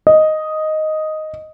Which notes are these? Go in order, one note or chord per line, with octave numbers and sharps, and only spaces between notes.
D#5